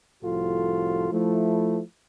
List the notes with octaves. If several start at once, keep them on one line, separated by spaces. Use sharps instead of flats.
C2 A2 F3 F4 F#4 A4
F3 A3 E4